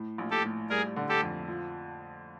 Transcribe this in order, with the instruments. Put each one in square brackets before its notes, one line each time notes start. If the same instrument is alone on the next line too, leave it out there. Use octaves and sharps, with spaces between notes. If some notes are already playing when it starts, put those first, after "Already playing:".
Already playing: [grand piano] A2
A#1
[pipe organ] G4 A4
[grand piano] A2
[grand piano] G3 [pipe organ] G#4 A#4
[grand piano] D3
[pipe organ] G4 A4
[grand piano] F2
F3